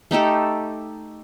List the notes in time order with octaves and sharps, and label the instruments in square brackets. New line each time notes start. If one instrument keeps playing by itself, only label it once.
[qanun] A3 D#4 G4 A4